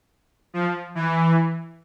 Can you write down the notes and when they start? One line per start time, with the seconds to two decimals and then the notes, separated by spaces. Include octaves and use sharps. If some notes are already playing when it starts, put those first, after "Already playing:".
0.53 F3
0.95 E3